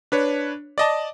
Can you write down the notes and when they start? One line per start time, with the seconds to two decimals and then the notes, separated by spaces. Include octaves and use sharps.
0.12 D4 B4 C#5
0.78 D5 D#5 A5